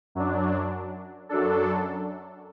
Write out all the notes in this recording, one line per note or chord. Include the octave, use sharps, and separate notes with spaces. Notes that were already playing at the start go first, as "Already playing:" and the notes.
F#2 F#3 D4
F#2 F#3 D4 A4